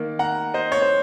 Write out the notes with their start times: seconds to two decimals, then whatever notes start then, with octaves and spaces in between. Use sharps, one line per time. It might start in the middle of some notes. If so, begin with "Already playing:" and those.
Already playing: D#3 A#3
0.19 F#5 A#5
0.54 C5 D#5
0.72 C#5
0.82 C5